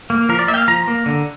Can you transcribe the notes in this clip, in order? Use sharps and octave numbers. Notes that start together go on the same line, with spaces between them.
A#3
F3 A#4
D5
A#3 E5
G5
F5
F3 A#5
A#3
D3